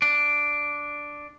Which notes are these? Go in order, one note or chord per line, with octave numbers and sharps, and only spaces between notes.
D4